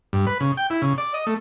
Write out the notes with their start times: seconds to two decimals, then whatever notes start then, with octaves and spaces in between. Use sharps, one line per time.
0.13 G2
0.27 B4
0.40 C#3
0.57 G5
0.70 E4
0.82 C#3
0.98 D5
1.14 D#5
1.27 A3